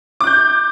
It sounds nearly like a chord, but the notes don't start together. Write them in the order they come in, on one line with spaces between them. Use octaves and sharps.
D6 F#6 G6